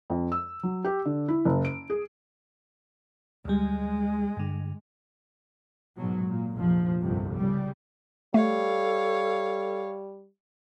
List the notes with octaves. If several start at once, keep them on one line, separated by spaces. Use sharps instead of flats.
F2
E6
F#3
G4
D3
E4
F#1
D7
G#4
D2 G3 G#3
G2 D3
G#2 B2 F#3
A#2
F1 A#1 F3
G1 C2 F2 C3
C#3 G3
G3 A3 A4 C#5 F5